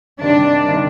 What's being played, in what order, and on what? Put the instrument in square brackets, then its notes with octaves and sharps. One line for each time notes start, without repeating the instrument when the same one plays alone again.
[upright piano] C3 D#3 G3 [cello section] D4
[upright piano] C3 D#3 G3